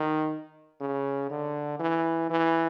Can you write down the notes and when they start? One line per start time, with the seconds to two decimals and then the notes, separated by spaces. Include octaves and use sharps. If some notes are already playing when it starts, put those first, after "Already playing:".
Already playing: D#3
0.81 C#3
1.30 D3
1.79 E3
2.30 E3